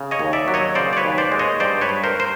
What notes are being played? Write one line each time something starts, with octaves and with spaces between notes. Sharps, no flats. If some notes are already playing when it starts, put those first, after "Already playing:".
Already playing: C#3
C#5 D#5
D#2
D5 E5
F#3
C#5 D#5
C#3 C5 D5
D5
B4 C#5
D#2
C5 D5
G#3
C#5 D#5
G2 C5 D5
B4 C#5
G2
A#4 C5
C5